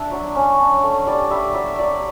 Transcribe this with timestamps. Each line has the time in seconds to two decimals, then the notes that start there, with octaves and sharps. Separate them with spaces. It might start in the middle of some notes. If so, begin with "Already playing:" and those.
Already playing: D4 D5 E5
0.11 F#3
0.36 C#4
0.59 D4
0.83 A3
1.07 G3 D5
1.31 G3 E5
1.54 F#3 E5
1.79 F#3 D5